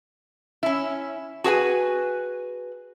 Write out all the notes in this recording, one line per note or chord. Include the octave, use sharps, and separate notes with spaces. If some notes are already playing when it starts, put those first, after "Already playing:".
C#4 E4
F#4 G#4 B4 G#5